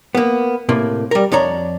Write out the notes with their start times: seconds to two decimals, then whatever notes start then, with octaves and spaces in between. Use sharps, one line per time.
0.15 A#3 B3
0.69 A2 C3 A#3
1.11 G3 A#4
1.32 F2 D4 C#5 A#5